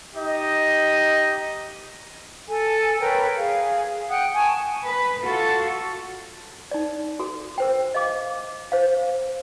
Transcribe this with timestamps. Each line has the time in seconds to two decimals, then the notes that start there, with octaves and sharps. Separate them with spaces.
0.16 D#4 G4 D#5
2.48 A4 G#5
3.00 A#4 B4 C#5 G5
3.36 G#4 F5
4.09 F#5 G5 D#6 F#6
4.34 G#5 A5 C#6 D#6
4.84 B4
5.24 F4 F#4 A4
6.71 D#4 D5
7.19 F#4 A4
7.58 A#4 C5 G5
7.94 D#5 F5 D6
8.72 C5 F5